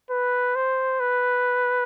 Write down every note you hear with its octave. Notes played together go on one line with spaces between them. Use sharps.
B4
C5
B4